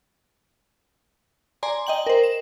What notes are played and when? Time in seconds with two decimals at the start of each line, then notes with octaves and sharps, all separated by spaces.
1.63 D5 G#5 A#5 C6
1.87 D#5 G5 F#7
2.06 A#4 C5
2.23 E7